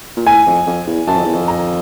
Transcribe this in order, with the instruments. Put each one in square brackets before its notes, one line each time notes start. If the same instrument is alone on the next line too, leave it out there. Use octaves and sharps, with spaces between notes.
[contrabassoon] A#2
[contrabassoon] A2 [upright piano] G#5
[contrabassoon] F2
F2
E2
[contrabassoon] F#2 [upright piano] A5
[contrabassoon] F2
E2
F2
[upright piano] A#5